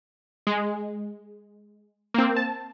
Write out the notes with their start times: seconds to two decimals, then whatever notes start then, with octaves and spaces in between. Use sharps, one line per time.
0.47 G#3
2.14 A#3 C4
2.36 A5